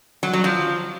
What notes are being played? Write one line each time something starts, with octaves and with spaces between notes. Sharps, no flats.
F#3
F#3
F3